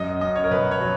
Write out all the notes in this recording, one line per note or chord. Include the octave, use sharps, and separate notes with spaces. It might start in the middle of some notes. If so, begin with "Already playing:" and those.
Already playing: F#2 F#3 D#5
F#2 D#5
C#5
A#4
B2 B4
C#5
F#3